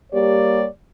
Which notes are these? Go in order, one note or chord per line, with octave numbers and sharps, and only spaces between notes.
G3 A#3 G4 C#5 D5